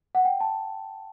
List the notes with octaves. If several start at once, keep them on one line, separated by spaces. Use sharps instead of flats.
F#5
G5
A5